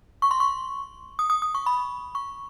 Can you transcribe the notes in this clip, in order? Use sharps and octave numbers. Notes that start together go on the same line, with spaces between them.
C#6
C6
C#6
D#6
D#6
D#6
C#6
B5
C#6